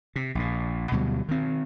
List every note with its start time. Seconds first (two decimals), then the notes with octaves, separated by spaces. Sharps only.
0.16 C3
0.35 A#1 A#2
0.92 D2 B2 F#3 G3
1.28 D#3 C4